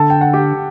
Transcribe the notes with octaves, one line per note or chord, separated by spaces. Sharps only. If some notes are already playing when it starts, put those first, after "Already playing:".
Already playing: D3 A4 A5
G5
F#5
G4 G5